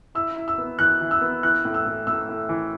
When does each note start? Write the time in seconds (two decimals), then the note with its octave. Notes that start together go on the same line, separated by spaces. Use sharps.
0.15 E4 E6
0.36 E4
0.48 E6
0.58 B3
0.79 E3 F#6
1.01 E3
1.11 E6
1.21 B3
1.43 E3 F#6
1.65 A2
1.74 E6
1.86 A2
2.07 A2 E6
2.29 A2
2.49 E3